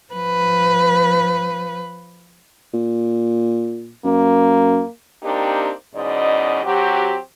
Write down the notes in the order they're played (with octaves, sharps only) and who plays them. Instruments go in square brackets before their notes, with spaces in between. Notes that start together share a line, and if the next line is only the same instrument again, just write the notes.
[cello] F3 B4
[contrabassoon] A#2
[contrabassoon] F#2 [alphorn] A#3
[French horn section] A#3 C4 D4 D#4 G4
E2 G#2 B2 C#4 D5 D#5
F#3 C4 F#4 G4